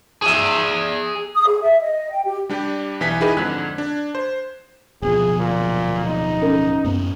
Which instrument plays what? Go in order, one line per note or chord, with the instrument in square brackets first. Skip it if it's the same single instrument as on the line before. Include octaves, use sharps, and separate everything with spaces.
[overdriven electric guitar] G#4 E5
[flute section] D#6
G#4
E5
D#5
G5
G4
[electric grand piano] G3 D4 G4
B1 E3 G#5 B6
D#4 E4 G4 G#4 A#4 B4
F2 G#2 D3 F#6 G#6 B6
D4
C5
[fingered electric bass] D1 B2 F3 [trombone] G#4
[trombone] A#2
D#4
[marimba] C#4 A4 A#4
[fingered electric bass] F#2 A2 B3